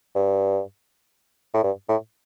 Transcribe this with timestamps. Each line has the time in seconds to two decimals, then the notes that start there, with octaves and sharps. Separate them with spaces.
0.15 G2
1.54 A2
1.63 G2
1.88 A2